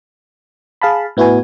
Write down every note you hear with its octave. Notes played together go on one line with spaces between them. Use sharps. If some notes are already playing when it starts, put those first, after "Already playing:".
G#4 F5 A5 B5
A2 B3 E4 F#4 B4 G#5